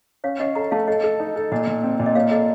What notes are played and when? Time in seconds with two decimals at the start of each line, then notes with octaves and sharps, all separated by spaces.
0.24 C#4 C#5 F5
0.39 C#4 D#5 F#5
0.55 A4 F#5 A#5
0.71 A3 F5 A5
0.88 A4 D#5 F#5
1.04 A4
1.20 D#4
1.36 A4
1.52 A#2 D#5 F#5
1.67 A#2
1.84 C4
2.00 A#2
2.06 D#5
2.15 A#3 C#5 F5
2.31 A4 D#5 F#5